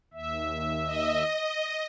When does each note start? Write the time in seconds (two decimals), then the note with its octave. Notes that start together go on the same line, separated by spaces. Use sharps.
0.13 D#2 E5
0.85 D#5